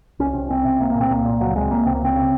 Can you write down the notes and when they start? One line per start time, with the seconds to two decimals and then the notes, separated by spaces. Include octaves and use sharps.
0.19 C2 C#4
0.34 C3
0.50 C2 C4
0.65 C3
0.80 C2 A#3
0.90 A#3
0.95 A#2
1.01 C4
1.10 C2 A#3
1.25 A#2
1.40 C#2 F#3
1.56 C3 G#3
1.71 C#2 A#3
1.86 C3 C4
1.95 A#3
2.02 C#2 C4
2.16 C#3